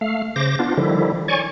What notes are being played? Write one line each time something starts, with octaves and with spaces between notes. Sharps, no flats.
A3 F5
C#3 C5 D6 A#6
B3 D4 F4
D3 D#3 F3 G3 E4
C#5 D5 G#5 C#6